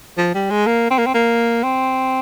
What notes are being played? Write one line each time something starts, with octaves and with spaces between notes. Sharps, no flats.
F3
G3
G#3
A#3
C4
A#3
C4
A#3
C4